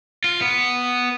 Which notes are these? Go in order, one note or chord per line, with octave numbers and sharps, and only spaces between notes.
F4
B3